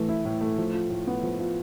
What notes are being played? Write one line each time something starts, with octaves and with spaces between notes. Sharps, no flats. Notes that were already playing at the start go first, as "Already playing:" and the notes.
Already playing: A2 E3 A3
E4
A2
A3
F3
F4
A2
B3
F3
F4